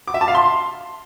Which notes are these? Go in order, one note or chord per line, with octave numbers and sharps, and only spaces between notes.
D6
E5
A5
F5
C6